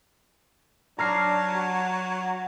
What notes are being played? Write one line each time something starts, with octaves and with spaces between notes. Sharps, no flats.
F#3 D4 A#5 F6 C7
F#4